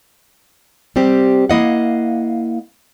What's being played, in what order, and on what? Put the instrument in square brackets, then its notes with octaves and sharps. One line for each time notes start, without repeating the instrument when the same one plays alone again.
[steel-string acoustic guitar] G3 C4 G4
A#3 E4 D#5 F5 F#5